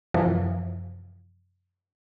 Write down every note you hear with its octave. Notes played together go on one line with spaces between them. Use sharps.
F#2 C3 E3 F3